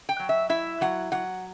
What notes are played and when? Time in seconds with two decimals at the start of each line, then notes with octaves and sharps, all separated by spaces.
0.09 G5
0.19 F#3
0.29 E5
0.49 E4 E5
0.81 F#3 F#5
1.12 F#3 F#5